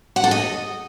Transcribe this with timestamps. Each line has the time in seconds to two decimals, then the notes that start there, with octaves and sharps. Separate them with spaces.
0.16 F#5
0.24 A4
0.31 D#5